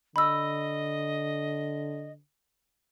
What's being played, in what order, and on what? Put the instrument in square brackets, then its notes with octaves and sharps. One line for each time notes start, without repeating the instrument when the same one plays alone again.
[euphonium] D3 [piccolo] D#5 [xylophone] B5 E6